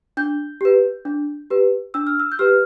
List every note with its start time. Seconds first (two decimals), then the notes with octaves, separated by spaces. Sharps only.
0.17 D4 G6
0.61 G4 B4
1.05 D4
1.50 G4 B4
1.94 D4 E6
2.07 F6
2.20 E6
2.32 G6
2.39 G4 B4 F6